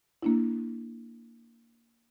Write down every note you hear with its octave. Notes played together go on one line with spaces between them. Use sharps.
A#3 D4 E4